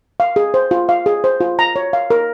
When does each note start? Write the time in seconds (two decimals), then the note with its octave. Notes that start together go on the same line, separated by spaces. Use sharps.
0.20 F5
0.36 G#4
0.54 C5
0.71 F4
0.89 F5
1.06 G#4
1.24 C5
1.40 F4
1.59 A#5
1.76 C#5
1.93 F5
2.10 A#4